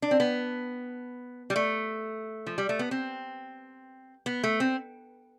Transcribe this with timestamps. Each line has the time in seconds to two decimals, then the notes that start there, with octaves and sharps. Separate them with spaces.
0.02 D4
0.11 C4
0.20 B3
1.50 G3
1.56 A3
2.47 F3
2.58 G3
2.69 A3
2.79 B3
2.91 C4
4.26 B3
4.43 A3
4.60 C4